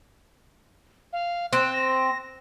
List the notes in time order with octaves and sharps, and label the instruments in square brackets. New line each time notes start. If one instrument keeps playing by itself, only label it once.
[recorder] F5
[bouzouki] C4 [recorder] F#6
[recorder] A#6